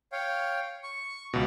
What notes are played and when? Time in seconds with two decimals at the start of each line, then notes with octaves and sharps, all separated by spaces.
0.12 C#5 F5 G5
0.83 C#6
1.33 C#2 B2